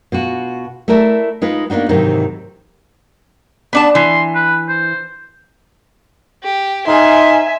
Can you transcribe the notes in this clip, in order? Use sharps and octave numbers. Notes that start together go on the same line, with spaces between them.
B2 F4 F#4
A3 E4 A4 A#4 D5 E5
G#3 D#4 F4 B4
A#3 B3 D4 D#4 F#4
G#2 C3 D#3 E3 F#3 D#4
B3 D4 A5
E3 C6
B4
C5
G4
G#2 D#4 G#4 E5 G#5 C6